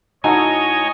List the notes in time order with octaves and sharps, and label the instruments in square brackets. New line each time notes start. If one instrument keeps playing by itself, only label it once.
[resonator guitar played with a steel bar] A2 D#4 F#4 [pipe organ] C#5 D#5 [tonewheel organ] G#5